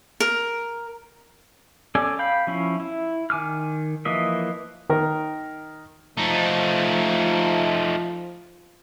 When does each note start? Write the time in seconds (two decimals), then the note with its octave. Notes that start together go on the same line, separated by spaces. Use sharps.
0.20 A#4
1.95 C#4 A4 D5 G#5
2.19 F5 G5 B5 G6
2.47 F3 C#4 E4
2.80 E4
3.30 D#3 G#5 D6 F6
4.05 E3 F3 A#3 D#5 E5
4.90 D#3 A#4
6.17 F3 A3 D#4